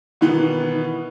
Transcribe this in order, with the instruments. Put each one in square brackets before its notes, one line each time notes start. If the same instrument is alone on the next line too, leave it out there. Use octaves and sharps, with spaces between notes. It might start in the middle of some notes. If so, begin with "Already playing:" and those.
[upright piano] B2 D#3 E3 B3